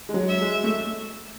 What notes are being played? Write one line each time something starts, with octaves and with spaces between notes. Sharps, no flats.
G#3
F#3
E5
G#3
A3